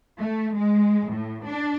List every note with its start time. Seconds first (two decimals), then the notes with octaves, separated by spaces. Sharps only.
0.20 A3
0.56 G#3
1.10 A2
1.46 D4